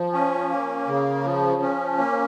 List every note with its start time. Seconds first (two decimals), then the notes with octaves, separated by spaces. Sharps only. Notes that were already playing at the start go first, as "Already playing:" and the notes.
Already playing: F3
0.13 C#4
0.50 A#3
0.88 C#3
1.24 F3
1.62 C#4
1.99 A#3